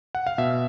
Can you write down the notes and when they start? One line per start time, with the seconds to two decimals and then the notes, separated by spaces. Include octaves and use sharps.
0.15 F#5
0.27 F5
0.38 B2 E5